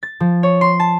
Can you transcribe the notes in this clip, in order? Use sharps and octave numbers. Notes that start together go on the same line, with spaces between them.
A6
F3
C#5
C6
A5